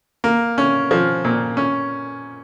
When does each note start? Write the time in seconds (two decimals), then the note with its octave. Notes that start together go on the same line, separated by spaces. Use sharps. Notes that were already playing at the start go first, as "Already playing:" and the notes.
0.24 A#3
0.58 C#4
0.91 F3
1.24 A#2
1.57 C#4